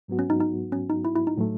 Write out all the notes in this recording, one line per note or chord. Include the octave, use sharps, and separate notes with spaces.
G#2 F#3 B3 F#4
C#4
D#4
D#4
C#4
D#4
E4
E4
D#4
A2 F#3 A3